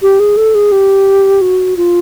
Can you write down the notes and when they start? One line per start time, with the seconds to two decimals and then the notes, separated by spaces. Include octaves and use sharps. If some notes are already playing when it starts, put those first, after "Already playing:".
0.02 G4
0.20 G#4
0.37 A4
0.55 G#4
0.72 G4
1.41 F#4
1.77 F4